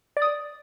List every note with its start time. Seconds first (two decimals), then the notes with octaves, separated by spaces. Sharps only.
0.17 D5
0.22 D#6
0.27 D5